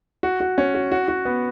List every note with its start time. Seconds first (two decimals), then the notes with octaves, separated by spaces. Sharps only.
0.23 F#4
0.40 F#4
0.58 C#4
0.75 F#4
0.92 F#4
1.08 F#4
1.25 B3